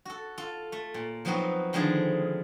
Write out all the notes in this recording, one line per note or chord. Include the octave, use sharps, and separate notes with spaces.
F#4 A4
F4 A4
A3
A#2
F3 F#3 B3 C4 D#4 F#4
D3 D#3 F3 G#3 A3 G#4